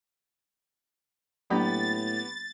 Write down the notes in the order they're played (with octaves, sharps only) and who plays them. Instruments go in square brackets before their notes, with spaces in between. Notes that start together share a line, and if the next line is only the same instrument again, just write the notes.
[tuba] A2 [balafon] F#3 A#3 D4 [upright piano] B3 G4 B5 [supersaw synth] A6